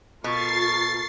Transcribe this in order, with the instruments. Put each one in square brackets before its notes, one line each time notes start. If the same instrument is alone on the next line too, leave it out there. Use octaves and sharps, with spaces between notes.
[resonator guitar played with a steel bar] B2 [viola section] F4 A4 A#4 [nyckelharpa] C#6 [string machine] A6 C7